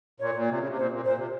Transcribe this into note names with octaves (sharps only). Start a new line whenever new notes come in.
A#2 C#5
A#2
C3
C#3
C3
A#2 C5
A#2
A#2 C5
C3